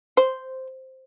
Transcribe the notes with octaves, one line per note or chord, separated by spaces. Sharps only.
C5